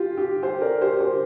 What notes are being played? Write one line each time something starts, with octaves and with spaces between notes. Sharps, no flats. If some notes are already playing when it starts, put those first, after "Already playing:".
Already playing: F4 G4
G4
G4 C5
A#4 D5
G4 C5
G4 C5